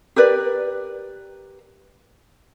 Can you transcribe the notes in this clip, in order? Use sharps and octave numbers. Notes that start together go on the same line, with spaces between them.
G4 A#4 B4 D5